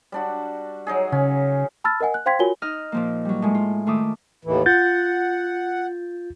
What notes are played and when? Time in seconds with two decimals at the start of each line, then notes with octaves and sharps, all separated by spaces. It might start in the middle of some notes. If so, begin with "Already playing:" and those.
0.12 G3 D4 F#4
0.87 F#3 D#4 G#4
1.12 C#3 C#4
1.84 A5 B5 E6 F6 A6
2.00 A#4 D#5 F#5 G#5
2.14 F#6
2.26 C5 F5 G5 C6 G#6 B6
2.39 F4 F#4 A#4 C#5 G#5 G7
2.62 D#4 D#5 F6
2.92 A#2 F3 A#3
3.25 F#3 G3
3.42 A2 G#3
3.55 F4
3.86 D#3 A3 F4 E5 D6 D#6
4.45 D#2 A2 E3
4.66 F4 F#5 G6 A6